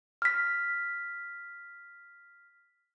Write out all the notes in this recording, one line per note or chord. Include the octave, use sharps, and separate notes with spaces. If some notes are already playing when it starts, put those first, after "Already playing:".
F6 B6